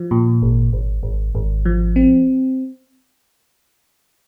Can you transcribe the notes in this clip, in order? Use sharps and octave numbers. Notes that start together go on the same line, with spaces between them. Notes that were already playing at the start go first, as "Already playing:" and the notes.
Already playing: F3
A#2
G#1
G#1
G#1
G#1
F3
C4